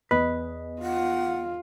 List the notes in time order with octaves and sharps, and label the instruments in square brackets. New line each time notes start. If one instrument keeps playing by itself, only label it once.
[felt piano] E2 D#5 [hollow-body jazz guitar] B4
[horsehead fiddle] F4 [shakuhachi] F#5